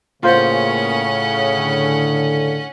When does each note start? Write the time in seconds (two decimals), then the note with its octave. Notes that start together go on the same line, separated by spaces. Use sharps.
0.23 A2 C#3 A#3 C#4 F4 C5 F#5
1.55 D3